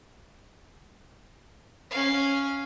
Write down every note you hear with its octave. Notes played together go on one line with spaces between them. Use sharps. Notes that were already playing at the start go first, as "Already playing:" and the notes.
C#4 F5